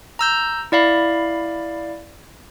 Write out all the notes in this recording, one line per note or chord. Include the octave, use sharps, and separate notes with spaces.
A#5 E6 G6
E4 D5 F5 B5